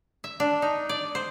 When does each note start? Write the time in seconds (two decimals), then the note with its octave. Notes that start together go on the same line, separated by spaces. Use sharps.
0.24 E5
0.40 D4
0.62 D#4
0.89 D5
1.15 C5